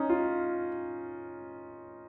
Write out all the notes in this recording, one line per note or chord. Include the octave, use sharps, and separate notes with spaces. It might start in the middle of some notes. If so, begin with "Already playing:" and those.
Already playing: C#4 D#4
F4